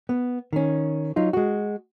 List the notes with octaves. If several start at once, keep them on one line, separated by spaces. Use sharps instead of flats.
B3
D#3 C#4
F#3 D#4 F4
G#3 F#4